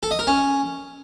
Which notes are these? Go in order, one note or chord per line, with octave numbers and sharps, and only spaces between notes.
A4
D#5
A#4
C#4